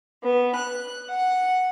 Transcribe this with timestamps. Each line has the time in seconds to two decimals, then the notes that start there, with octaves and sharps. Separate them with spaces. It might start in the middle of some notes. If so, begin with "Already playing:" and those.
0.23 B3
0.55 F#6
1.09 F#5